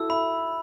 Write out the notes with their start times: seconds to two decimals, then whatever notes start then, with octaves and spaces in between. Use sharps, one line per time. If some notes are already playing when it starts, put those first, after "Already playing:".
Already playing: E4 F#4 A4 E6
0.10 E5 B5